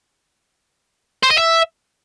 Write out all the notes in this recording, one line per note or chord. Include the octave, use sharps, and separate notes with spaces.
C5
D#5
E5